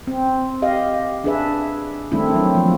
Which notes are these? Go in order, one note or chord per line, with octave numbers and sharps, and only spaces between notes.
C4
G4 D#5 F5
D4 G#4 B4 E5
D#3 G3 A3 C4 D4 E4
F#3 C4
F3 A#3